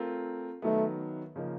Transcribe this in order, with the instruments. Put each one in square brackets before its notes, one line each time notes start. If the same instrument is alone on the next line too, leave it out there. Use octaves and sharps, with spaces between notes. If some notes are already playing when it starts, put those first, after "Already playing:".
Already playing: [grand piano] A3 C4 F4 A#4
[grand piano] D#3 F#3 B3 [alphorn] A3
[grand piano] C#3 F3 A#3 D#4